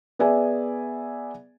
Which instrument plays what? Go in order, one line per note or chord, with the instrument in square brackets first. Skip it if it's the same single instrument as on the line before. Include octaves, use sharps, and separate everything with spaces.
[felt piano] B3 G#4 D5 E5 G#5